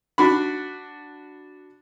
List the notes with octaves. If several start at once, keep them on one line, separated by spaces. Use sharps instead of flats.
D4 F#4 B5